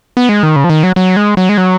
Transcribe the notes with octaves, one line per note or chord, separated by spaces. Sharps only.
B3
G#3
D#3
C#3
F3
D#3
F#3
F#3
G#3
F#3
G#3
F#3